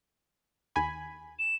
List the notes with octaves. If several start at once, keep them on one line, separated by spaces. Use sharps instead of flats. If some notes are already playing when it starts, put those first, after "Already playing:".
D#2 G#5 B5
E7